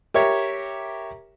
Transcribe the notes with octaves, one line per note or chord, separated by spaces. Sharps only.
G4 A#4 C#5 E5